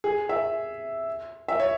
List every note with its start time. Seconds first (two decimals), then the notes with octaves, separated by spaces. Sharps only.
0.04 G#4
0.29 E5
1.48 E5
1.60 C#5